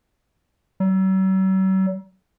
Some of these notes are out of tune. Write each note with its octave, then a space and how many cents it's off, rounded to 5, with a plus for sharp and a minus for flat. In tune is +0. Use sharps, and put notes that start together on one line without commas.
F#3 +45